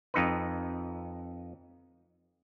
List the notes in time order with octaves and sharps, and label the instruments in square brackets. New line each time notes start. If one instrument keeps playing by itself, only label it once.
[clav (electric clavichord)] F2 D#4 B4